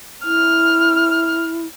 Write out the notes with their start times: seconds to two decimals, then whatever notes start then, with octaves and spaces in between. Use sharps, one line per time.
0.24 E4 F6